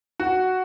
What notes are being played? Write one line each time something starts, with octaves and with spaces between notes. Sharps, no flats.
F#4